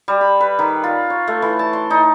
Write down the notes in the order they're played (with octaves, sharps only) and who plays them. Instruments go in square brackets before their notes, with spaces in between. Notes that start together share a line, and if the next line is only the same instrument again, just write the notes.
[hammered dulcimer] G3
B5
B4
D#3
F4
C#5
A3
E3
A5
C6
D#4